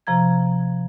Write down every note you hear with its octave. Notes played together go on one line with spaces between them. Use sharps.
C3 F3 A#5 G#6